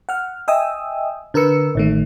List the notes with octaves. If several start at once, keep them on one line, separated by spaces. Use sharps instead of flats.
F#5 F6
D#5 E5 G5 G#5 D#6 E6
D3 A#4 B4 E6 C#7
A1 D#3 A3